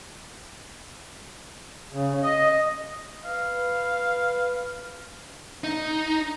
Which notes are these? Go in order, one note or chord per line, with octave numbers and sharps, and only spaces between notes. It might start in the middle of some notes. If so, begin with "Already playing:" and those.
C#3
D#5
B4 F5
D#4